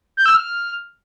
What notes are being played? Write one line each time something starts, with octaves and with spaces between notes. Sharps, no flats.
G6
E6
F6